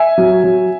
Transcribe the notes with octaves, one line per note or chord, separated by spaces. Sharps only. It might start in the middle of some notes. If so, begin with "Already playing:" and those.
Already playing: E5 G#5
F#3
F#3